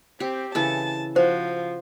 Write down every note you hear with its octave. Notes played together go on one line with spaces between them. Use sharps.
C4 G4
C#3 E3 A4 A5
F3 F#4 C5